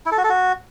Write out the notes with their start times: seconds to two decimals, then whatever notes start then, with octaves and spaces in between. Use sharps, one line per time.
0.06 E4
0.12 A4
0.18 F#4
0.24 A4
0.30 F#4